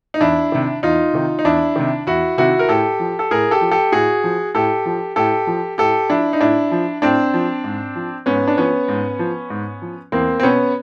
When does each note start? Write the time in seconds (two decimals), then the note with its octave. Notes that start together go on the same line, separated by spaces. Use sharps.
0.14 D#4
0.21 E2 D4 E4
0.52 C3 D#3
0.83 E2 D#4 F4
1.13 C3 D#3
1.39 D#4
1.45 E2 D4 E4
1.76 C3 D#3
2.07 E2 E4 F#4
2.38 C3 D#3 E4 F#4
2.59 A#4
2.69 A2 G4 A4
3.00 F3
3.19 A4
3.31 A2 G#4 A#4
3.51 G4 A4
3.61 F3
3.71 G4 A4
3.92 A2 F#4 G#4
4.24 F3
4.55 A2 G4 A4
4.86 F3
5.16 A2 G4 A4
5.47 F3
5.78 A2 G4 A4
6.10 F3 D4 E4
6.33 D#4
6.40 A2 D4 E4
6.72 F3
7.02 A2 C4 D4
7.34 F3
7.64 G#2
7.96 F3
8.26 G#2 B3 C#4
8.48 D4
8.57 F3 B3 C#4
8.88 G#2
9.19 F3
9.50 G#2
9.82 F3
10.12 E2 A#3 C4
10.40 C4
10.43 B2 B3 C#4